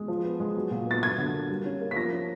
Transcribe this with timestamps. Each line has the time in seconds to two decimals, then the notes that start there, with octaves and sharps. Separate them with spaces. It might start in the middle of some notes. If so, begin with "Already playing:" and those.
Already playing: G#3
0.08 F3
0.24 B3
0.40 G#3
0.56 F#3
0.71 A#2
0.87 B3 A6
1.03 F#3 G#6
1.18 D3
1.34 A#3
1.49 G3
1.65 C#4
1.81 A#3
1.91 B6
1.96 F3 A#6
2.12 C#4